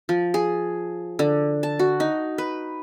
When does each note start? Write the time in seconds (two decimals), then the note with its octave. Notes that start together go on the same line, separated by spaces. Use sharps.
0.09 F3
0.34 G#4
1.19 D3
1.63 A5
1.79 F#4
2.00 D#4
2.38 B4